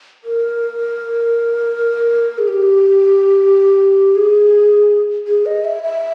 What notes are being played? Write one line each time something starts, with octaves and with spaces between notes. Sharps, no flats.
A#4
G#4
G4
G#4
G#4
D#5
E5
E5